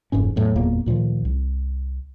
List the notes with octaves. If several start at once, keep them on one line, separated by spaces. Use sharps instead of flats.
F#1 F2 G#2 C#4
E2 A2 F#3
F#1 E2 A#2 A#3
D2 A#2 D#3 F3
C2